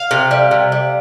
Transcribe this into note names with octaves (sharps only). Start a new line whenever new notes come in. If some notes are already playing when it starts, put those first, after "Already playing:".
Already playing: F5
C3
G3
C3
G3